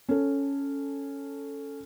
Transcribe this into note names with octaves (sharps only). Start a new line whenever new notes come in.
C#4 A4